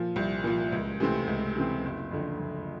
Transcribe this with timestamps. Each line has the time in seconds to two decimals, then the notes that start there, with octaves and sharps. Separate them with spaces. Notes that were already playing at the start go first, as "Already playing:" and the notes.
Already playing: A#2 F3
0.16 C2
0.44 A#2 F3
0.72 C#2
1.00 C3 E3 A3 C4
1.27 C#2
1.55 C3 E3 A3 C4
1.84 F#1
2.11 F2 D3
2.39 F#1